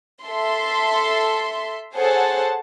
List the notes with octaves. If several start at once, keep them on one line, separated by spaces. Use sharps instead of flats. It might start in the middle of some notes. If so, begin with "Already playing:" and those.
A4 E5 C6
G#4 A4 C5 C#5 F#5 A5